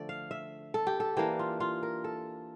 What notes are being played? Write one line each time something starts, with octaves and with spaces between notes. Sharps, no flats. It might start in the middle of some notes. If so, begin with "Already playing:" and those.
Already playing: D3 F3 A3 D5
F5
E5
A4
G4
A4
E3 A#3 D4 G4
F4
F4
A#4
A4